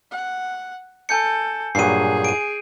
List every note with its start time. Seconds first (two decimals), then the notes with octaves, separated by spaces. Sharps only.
0.12 F#5
1.09 A4 G#5 G6 C#7
1.75 G2 A#2 F#3 G#4 C7 D#7
2.25 D7 D#7